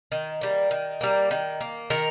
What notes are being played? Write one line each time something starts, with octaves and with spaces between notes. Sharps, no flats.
D#3
G3 A#3
D#3
G3 A#3
D#3
A#3
D#3 A#4